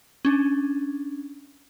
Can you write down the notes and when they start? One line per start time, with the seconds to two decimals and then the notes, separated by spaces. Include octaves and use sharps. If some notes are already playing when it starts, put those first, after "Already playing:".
0.25 C#4 D4